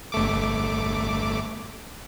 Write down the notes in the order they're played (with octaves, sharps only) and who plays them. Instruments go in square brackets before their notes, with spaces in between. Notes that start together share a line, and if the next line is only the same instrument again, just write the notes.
[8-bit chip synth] G1 A3 D6